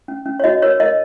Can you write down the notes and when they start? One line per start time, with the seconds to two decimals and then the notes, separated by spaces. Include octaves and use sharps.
0.08 C#4
0.26 C#4
0.40 C#5
0.44 F#4 D#5
0.62 A#4 C#5
0.80 A#4 D#5